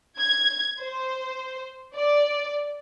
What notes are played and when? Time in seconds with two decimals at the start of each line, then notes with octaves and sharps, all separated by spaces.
0.19 G#6
0.81 C5
1.96 D5